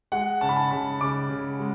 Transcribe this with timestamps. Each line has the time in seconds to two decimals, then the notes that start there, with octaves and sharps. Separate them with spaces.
0.12 G#3 F#5
0.41 C#3 A5
0.49 B5
0.56 A5
0.71 C#3 B5
1.01 C#3 D6
1.30 C#3
1.60 G#3